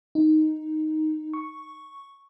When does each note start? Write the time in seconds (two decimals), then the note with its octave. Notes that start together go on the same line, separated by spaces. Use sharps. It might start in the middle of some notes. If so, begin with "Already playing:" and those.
0.15 D#4
1.34 C#6